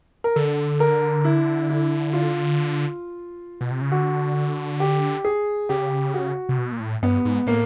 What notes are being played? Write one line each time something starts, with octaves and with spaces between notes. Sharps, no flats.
A#4
D3 A4
A#4
E4
E4
F4
B2
C3
C#3
D3 F#4
G4
G#4
C#3 G4
F#4
C3
B2
A#2
A2
G2 B3
G#2
A2 A#3